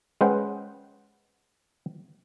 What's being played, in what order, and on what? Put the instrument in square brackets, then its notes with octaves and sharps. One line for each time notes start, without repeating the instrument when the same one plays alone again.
[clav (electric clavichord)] G#3 C#4 B4 C5 F#5 G5